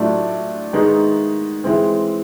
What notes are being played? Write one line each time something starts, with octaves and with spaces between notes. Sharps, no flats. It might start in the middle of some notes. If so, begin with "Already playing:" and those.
Already playing: A2 F#3 A3 D4 F4
D#3 G#3 B3 D#4
E3 G#3 C4